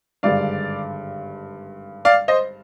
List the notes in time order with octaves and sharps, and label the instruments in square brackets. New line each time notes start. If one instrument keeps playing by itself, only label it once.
[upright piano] G#1 G2 D3 G#3 [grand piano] D5 F5
[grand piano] D5 F5
C5 D#5